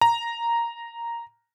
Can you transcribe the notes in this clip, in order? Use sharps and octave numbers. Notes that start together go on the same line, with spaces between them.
A#5